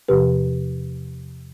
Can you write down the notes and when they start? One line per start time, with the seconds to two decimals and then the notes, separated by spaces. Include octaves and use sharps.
0.08 E2 C3 F3 G4 B4